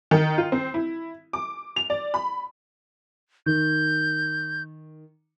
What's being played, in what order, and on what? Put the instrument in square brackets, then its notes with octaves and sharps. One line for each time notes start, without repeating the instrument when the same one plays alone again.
[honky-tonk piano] D#3
F4
C4
E4
D6
F7
D5
B5
[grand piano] D#3 [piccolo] G6